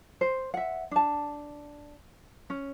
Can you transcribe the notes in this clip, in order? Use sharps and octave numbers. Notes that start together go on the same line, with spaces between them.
C5
E5 F#5
D4 A5
C#4